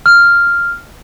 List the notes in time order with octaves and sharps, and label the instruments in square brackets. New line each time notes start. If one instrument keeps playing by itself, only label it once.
[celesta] F6